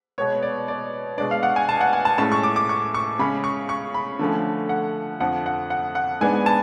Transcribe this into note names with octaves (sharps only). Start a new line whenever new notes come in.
B2 G#3 B3 C#5
D5
D5
B2 G#3 D4 D5
F5
F#5
G#5
A5
F#5
G#5
A5
A2 G#3 C#4 A5
C#6
D6
D6
C#6
C#6
C#3 G#3 C#4 B5
C#6
C#6
B5
D3 F3 A3 C#4
F#5
F2 D3 F3 F#5
F#5
F#5
F#5
G#2 G#3 B3 D4 G#5
A5